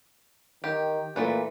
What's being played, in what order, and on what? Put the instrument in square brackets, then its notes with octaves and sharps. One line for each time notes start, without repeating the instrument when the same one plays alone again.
[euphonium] D#3 [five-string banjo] G4
[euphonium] A#2 [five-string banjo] E3 A3 B4